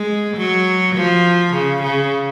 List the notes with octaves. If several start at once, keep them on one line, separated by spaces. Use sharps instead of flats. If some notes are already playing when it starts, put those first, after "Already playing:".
Already playing: G#3
F#3
F3
C#3
C#3